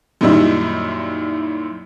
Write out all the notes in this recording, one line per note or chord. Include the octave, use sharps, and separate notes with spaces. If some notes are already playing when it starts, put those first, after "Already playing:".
F#2 A#2 D#3 G3 D#4 E4